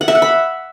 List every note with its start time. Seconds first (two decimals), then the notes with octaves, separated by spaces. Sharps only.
0.01 F#5
0.08 E5
0.15 F#5
0.22 B5